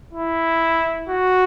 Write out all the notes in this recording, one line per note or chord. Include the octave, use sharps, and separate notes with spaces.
E4
F#4